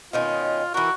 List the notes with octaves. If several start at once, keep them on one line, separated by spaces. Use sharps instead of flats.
B2 D#3 C#4 F4
E3 F#4 A#4